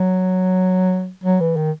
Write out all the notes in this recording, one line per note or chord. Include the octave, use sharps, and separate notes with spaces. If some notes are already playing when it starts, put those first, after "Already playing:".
Already playing: F#3
F#3
E3
D#3